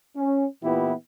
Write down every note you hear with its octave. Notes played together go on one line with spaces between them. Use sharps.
C#4
A#2 E3 B3 E4 F4 G4